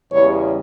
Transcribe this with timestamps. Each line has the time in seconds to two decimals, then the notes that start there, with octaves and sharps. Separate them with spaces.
0.11 E2 C#3 G3 C#5